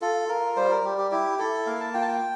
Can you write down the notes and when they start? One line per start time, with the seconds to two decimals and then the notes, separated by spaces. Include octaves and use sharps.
0.02 F4 A4
0.29 F4 A#4
0.56 G3 C5
0.70 A#4
0.84 G3 G4
0.98 G4
1.11 E4 G4
1.39 E4 A4
1.67 A#3 F5
1.80 A5
1.94 F4 G5
2.01 A5
2.08 G5